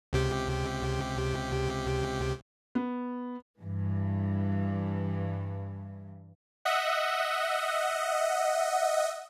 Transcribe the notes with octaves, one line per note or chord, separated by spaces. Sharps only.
C#2 C3 G4
B3
G2 E3
D#5 E5 F#5